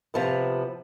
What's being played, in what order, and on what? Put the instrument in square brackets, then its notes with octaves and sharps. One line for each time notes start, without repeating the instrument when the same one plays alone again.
[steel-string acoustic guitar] C3 F3 B3